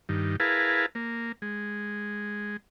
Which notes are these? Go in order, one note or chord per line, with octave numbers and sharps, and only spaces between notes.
G2 D#3
E4 G#4 A#4 B4 F5 A5
A#3
G#3